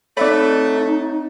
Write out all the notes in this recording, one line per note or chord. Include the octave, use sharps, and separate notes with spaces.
A3 C4 D#4 C#5 D5 E5 B5